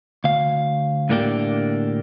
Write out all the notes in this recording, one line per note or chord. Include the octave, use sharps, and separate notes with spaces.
D2 F5
A2 D3 A#3 D4 G4